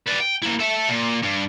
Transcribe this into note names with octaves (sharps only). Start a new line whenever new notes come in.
B4 D5
G5
A#3 E4
A4 E5
A#2
G2